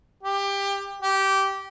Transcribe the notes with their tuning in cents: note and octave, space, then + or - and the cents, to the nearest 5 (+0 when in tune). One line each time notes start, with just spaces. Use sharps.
G4 +20
G4 -15